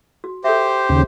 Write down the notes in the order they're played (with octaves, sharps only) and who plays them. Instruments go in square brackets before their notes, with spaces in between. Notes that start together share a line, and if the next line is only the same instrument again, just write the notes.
[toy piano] F#4
[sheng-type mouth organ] G4 C5 [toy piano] A4 E5
[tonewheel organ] D#2 C#3